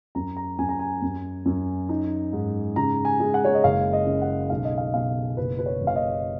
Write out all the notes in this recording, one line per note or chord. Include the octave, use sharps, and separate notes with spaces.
F#2 A#5
A#5
F#2 G#5
A#5
G#5
F#2
F#2
D#4
G#2
C#3 A#5
G#5
G#3
F#5
C#5
D#5
F#1 F5
D#5
C#3
F#5
B1 F5
D#5
F5
B2 F5
F#1 B4
B4
C#5
F#1
F5
D#5